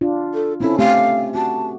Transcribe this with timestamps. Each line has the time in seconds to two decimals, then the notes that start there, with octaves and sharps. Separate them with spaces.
0.01 D4 F4
0.34 A4
0.60 C4 C#4 E4 A4
0.79 A3 C4 G4 F5
1.35 F#4 A5